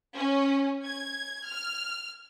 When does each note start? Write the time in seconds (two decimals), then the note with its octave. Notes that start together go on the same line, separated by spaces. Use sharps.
0.16 C#4
0.84 G#6
1.48 F6